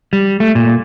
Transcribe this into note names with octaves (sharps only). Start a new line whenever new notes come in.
G3
A3
A#2